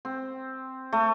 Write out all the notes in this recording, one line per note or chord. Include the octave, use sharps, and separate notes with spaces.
C4
A3